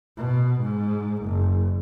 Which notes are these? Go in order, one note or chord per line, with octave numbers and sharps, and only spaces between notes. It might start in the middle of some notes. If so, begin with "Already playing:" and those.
B2
G#2
F#1